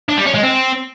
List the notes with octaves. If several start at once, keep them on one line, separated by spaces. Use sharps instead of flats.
D4
G3
C#4
G#3
C4